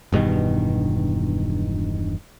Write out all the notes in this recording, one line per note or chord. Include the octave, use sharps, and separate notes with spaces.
E1 G2 B2 D#3